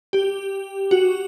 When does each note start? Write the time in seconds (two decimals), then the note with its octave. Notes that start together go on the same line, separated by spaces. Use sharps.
0.13 G4
0.91 F#4